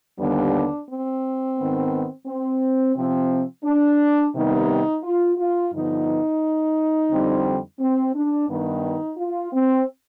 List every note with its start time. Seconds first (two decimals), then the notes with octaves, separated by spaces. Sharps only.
0.18 D#2 D3 G3 B3 D4
0.87 C4
1.57 G#2 D#3 B3
2.26 C4
2.95 C3 F3 C4
3.64 D4
4.33 C3 D#3 G3 B3 D#4
5.03 F4
5.37 F4
5.72 G2 D3 F3 B3 D#4
7.10 F2 D3 G3 C4
7.79 C4
8.14 D4
8.48 G2 D#3 G3 B3 D#4
9.17 F4
9.52 C4